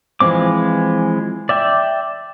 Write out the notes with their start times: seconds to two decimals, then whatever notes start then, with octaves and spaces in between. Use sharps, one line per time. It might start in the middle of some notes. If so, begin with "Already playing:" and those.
0.20 E3 F3 G#3 C4 D6
1.49 D5 E5 G5